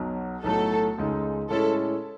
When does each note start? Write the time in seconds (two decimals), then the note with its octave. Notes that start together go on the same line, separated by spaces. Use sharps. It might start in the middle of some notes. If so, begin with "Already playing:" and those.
Already playing: B1 B2 F#3
0.44 B1 A2 F#3 A3 A4
0.98 C#2 C#3 G#3 D#4
1.50 A2 G#3 C#4 E4 A4